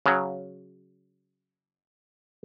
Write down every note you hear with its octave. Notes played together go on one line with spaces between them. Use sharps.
C#3 F#3